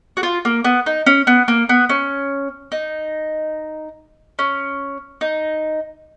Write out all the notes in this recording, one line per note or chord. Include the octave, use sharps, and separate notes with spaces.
F#4
F4
A#3
B3
D#4
C#4
B3
A#3
B3
C#4
D#4
C#4
D#4